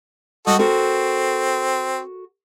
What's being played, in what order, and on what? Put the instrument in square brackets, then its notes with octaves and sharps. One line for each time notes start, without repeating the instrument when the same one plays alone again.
[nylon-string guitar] G3 [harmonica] F#4 A4 D#5
[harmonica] C4 [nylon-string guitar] F#4 A4 A#4